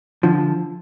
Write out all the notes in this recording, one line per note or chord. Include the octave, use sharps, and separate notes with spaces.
D3 F3